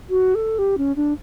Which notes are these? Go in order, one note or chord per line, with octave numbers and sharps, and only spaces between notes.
F#4
A4
G4
C#4
D4